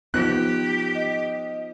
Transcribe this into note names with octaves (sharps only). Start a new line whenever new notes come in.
F3 B3 D#4 G4 F#6
D#5